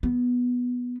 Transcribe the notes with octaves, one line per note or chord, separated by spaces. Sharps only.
B3